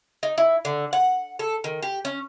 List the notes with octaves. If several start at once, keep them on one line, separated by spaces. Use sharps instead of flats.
D#4
E4
D3
F#5
A4
D#3
G4
C#4